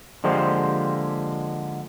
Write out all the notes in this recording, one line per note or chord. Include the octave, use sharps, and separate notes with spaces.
D3 F3 G#3 A#3 G4 C5